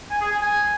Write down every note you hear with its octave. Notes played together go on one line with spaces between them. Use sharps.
G#5
G#4
G#5
G#5